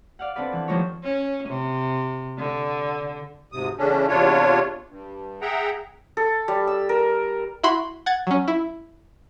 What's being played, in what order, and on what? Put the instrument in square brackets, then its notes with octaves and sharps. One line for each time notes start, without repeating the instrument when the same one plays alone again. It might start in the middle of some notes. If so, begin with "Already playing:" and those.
[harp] D5 F5 F#5
B3 C4 D4 A4 B4 D5
E3 F#6
D#2 F3 A3 D#4 C#5
[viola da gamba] C#4
C3
D3
[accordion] D2 G#2 C3 D#6
E2 C#3 A3 C#4 D4
E2 C3 D4 F4 C#5
G2
G#4 E5 F#5 G5 A#5
[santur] A4
G3
E6
A#4
[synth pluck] E4 F#4 B5 C6
F#5 G#6 A6
F#3 C#4
E4